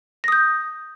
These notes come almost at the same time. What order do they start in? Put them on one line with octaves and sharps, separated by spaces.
A#6 D#6 G6